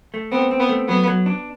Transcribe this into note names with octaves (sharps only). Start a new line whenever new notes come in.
A3
B3 C4
C4
B3
A3
F#3 B3
F#3
D4